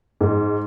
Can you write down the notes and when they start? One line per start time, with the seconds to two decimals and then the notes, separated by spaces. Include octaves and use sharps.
0.21 G#2